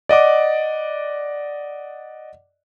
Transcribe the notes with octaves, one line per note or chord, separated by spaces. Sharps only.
D5 D#5 F#5 D6